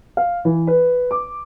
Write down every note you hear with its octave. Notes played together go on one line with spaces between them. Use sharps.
F5
E3
B4
D6